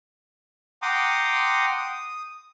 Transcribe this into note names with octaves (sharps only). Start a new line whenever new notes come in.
F#5 G5 A#5 C6 D6 D#6
D#6